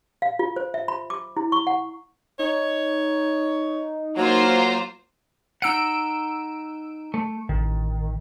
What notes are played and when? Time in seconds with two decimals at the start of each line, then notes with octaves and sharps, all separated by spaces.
0.22 F5
0.39 F4
0.56 C5
0.74 E5
0.88 B5
1.10 D6
1.37 E4
1.52 C#6
1.67 F#5
2.39 D#4 C#5
4.17 F#3 A#3 F4 C5
5.62 D#4 F#5 E6 D7
7.14 A3
7.49 A1 D#3